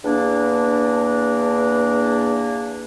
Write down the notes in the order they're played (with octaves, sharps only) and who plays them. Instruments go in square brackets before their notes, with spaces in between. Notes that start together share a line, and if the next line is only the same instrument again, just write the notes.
[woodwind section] E2 A#3 D4